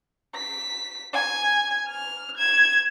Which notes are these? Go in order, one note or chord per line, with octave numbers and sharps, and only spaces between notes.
B6
G#5
F6
G#6 E7